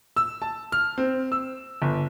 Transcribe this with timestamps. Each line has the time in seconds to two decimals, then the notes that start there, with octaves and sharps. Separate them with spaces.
0.16 E6
0.42 A5
0.72 F6
0.98 C4
1.32 E6
1.82 G1